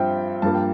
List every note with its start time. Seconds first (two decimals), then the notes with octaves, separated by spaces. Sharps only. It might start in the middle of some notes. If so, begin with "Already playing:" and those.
Already playing: G2 F3 C4 E5 G5
0.42 G2 F3 A#3 A5
0.54 G5